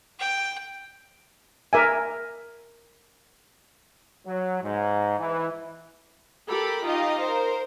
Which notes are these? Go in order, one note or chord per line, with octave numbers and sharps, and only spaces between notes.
G5
A#4 E5 G#5
F#3
G#2
E3
G4 A4 A#4 B5
D#4 F4 G4 D#5 F5
A#4 C5